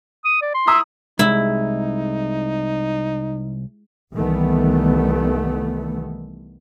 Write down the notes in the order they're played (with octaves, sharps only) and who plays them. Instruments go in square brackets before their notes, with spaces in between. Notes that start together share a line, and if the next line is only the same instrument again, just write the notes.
[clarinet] D#6
D5
C6
[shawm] E4 [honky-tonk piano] A#5 D#6
[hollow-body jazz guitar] C2 [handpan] G#3 [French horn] D#4 [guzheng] E4
[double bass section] C2 D#3 E3 G3 A3 B3